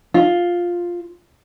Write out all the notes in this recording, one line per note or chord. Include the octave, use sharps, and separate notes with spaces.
F4